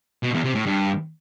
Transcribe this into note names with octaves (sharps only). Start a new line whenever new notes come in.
B2
E2
C3
A2
G2